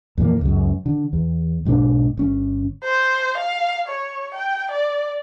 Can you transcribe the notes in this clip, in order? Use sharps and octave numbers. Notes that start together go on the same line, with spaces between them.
F2 A#2 E3 A#3
C#2 F#2
D3
E2
B1 G#2 B2 D4
G1 C#4
C5
F5
C#5
G5
D5